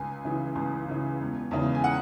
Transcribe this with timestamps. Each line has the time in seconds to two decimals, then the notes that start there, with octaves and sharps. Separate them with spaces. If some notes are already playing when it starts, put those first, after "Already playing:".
Already playing: C#2 G#5
0.25 C#3 E3
0.55 C#2
0.88 C#3 E3
1.20 E1
1.51 E2 C#3 E3
1.75 G#5
1.84 F#5